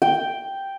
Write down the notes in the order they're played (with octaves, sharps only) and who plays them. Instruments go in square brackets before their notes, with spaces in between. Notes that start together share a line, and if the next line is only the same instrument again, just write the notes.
[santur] G5